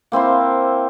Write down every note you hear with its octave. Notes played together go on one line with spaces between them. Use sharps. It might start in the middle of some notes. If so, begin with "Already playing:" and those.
A#3 C4 E4 C5